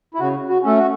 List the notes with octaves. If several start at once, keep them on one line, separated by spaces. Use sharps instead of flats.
E4
C#3 F#4
F#4
A3 C#4 A4
F#4